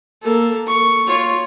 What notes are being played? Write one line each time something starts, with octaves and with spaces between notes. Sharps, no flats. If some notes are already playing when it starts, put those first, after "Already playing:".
A#3 A4
C#6
F4 C#5